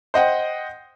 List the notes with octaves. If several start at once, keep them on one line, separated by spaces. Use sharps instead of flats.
C5 D#5 F#5 G5